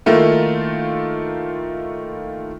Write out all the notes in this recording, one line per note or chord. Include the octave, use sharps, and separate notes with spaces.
D#3 A3 A#3 E4 F4